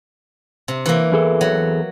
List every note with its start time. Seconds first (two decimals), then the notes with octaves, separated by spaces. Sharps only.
0.68 C3
0.86 E3 A#3
1.12 E2 G#4 A4
1.41 F#3